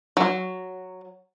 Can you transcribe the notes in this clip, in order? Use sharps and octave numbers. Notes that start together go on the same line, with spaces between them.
F#3